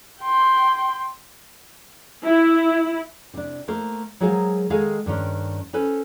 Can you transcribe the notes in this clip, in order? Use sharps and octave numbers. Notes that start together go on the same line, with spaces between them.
G5 C6
E4
C3 D4
A3 A#3 A#4 C5
F#3 G#3 G#4 A#4 C5 F5
D#3 G#3 G#4 A4 F5
G2 D#3 C#4 D4
C#4 A4 B4 C5